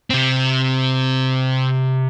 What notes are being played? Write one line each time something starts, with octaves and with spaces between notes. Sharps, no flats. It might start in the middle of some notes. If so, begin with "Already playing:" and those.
C3 C4